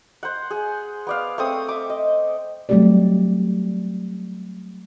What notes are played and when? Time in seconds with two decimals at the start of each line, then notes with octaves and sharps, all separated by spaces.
0.23 C5 F#5
0.51 G#4
1.07 B3 D5 F5
1.38 A3 C4 D#6
1.69 E5 D6
1.90 D#5
2.69 F#3 G3 A3 C4 G4 D5